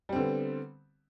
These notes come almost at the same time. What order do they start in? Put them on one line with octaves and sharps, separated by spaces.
G3 C4 D3 B3